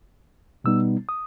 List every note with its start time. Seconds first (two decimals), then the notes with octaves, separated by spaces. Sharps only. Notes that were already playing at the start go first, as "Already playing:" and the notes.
0.64 B2 G3 B3 D#4 E6
1.09 D#6